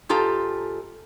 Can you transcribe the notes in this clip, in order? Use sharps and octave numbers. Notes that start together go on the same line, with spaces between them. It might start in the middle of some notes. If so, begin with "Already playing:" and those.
G#2 F4 G4 A4 A#5